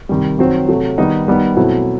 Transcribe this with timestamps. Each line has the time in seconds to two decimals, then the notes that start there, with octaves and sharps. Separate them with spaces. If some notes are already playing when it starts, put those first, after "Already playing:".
0.09 C3 D#3 G3
0.39 D#3 F#3 C4
0.68 C3 F#3 A3
0.98 D#3 G3 B3 D#4
1.28 D#3 G3 B3 D#4
1.56 B2 F#3 A3 C4 E4